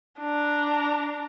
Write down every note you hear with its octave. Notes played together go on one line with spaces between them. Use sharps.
D4 A#5